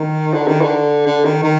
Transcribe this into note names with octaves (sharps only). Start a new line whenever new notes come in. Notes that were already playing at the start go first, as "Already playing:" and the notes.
Already playing: D#3
D3
D#3
D3
D3
D#3
D#3